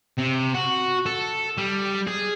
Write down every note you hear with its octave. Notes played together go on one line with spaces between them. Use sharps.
C3
F#4
A4
G3
G#4